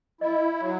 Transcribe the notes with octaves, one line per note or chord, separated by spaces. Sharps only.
E4 D#5
F#3